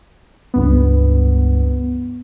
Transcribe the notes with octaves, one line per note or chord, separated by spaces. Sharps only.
C#2 G2 B3